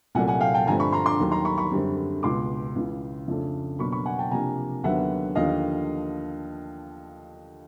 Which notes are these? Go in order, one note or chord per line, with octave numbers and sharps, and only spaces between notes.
C2 A#2 F#3 A3 F#5 G#5
F#5 G#5
F5 G5
G5 A5
G2 D3 F3 A3 C4 G#5 A#5
B5 C#6
A#5 C6
C6 D6
D#2 D#3 F#3
A#5 C6
B5 C#6
B5 C#6
F#2 D3 G3 C4
C#2 B2 G#3 C6 D6
C#2 C#3 E3
F2 C#3 F3 A3 D4
B2 F#3 A#3 D4 B5 C#6
B5 C#6
F#5 G#5
G5 A5
C3 F3 A#3 D4 G#5 A#5
D#2 D3 F#3 B3 D4 E5 F#5
D#2 D3 F3 D#5 F5